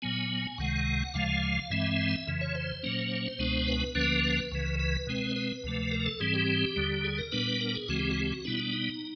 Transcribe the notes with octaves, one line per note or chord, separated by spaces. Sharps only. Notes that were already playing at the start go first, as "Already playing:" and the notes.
A#2 F#3 B3 G#5
C#2 C3 D#3 G#3 F#5
D2 C#3 F3 G#3 F5
G2 E3 G#3 C4 E5
F2 C#3 E3
C#5
C5
A#2 F#3 A#3 C#4
C#2 B2 G#3 B3 D4
B4
D2 D3 F3 A#3 C#4
B4
C#2 C#3 E3
B4
B2 G#3 C4
B4
D2 C3 F3 A3
A#4
A4
G#2 E3 G3 C4 G#4
G4
D#2 D3 G3
G#4
A#4
A#2 G3 B3 D4 B4
A#4
G#4
D2 C#3 E3 G#3 C4 F#4
G4
F#4
G4
F#4
B2 G3 B3 D4 E4
D4
D#4